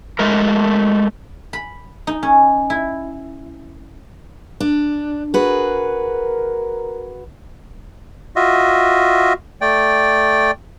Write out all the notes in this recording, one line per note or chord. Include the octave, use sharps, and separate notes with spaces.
G#3 A3 A#4
B5
D#4
C#4
E4
D4
F#4 G#4 A#4 B4
F4 F#4 D#5 E5
A3 D5 G5